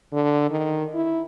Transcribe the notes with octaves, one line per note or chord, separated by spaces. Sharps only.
D3
D#3
E4